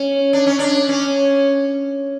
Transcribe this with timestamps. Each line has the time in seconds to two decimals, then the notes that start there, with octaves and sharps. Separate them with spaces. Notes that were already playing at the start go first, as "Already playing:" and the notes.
Already playing: C#4
0.33 D4
0.47 C#4
0.59 D4
0.89 C#4